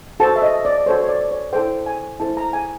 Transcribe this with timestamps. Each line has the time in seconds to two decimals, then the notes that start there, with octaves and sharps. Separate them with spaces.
0.20 F#4 A4 C5 A5
0.36 E5
0.42 D#5
0.65 D5
0.86 F#4 A4 C5 C#5
1.00 C#5
1.09 D5
1.31 C#5
1.53 E4 A4 C5 G5
1.86 G#5
2.20 E4 A4 C5 A5
2.37 A#5
2.53 G#5